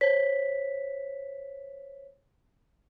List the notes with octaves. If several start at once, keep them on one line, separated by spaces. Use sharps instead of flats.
C5 C#5 B6